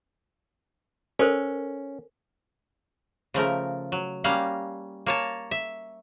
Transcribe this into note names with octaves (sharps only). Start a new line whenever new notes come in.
C#4 A4 A#4 C5
C#3 F3 A3 A#4
F#3
G3 A#3 C#4 F5 F#5
A#3 C#5 A5
E5